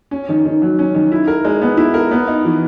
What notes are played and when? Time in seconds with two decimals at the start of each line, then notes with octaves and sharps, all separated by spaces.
0.11 C#4
0.29 D#3
0.45 D#3
0.62 F#3
0.79 C#4
0.95 D#3
1.12 E4
1.28 A#4
1.45 G#3
1.61 B3
1.77 E4
1.94 A#4
2.11 B3
2.27 D#4
2.45 E3